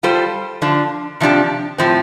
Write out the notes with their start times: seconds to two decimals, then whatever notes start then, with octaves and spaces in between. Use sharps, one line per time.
0.03 G3 F4 A4 C5
0.62 D3 F3 D4
1.20 C3 F3 D4 G4
1.78 A2 F3 C4